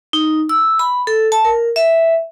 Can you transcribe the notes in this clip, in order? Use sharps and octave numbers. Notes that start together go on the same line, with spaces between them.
D#4
E6
B5
A4
A5
A#4
E5